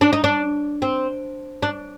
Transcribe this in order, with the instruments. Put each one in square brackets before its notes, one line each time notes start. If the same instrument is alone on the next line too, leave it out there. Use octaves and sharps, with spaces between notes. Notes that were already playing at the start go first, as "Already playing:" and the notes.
[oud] D4
D#4
D4
C4
D4